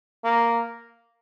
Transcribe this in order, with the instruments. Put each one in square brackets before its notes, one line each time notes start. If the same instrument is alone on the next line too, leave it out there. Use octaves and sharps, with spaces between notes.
[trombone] A#3